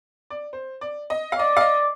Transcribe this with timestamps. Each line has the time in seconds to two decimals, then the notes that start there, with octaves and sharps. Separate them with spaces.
0.30 D5
0.53 C5
0.81 D5
1.10 D#5
1.32 F5
1.39 D5 D#5
1.57 F5
1.61 D#5